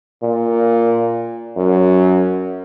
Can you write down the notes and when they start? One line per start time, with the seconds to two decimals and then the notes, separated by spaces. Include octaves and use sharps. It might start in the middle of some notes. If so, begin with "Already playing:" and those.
0.23 A#2
1.57 F#2